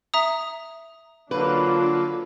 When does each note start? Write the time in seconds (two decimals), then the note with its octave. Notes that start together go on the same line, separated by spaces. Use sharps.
0.14 E5 A#5 D#6
1.31 D3 F#3 A#3 D4 F4 B4